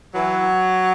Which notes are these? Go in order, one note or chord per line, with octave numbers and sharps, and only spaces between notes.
E3 F#3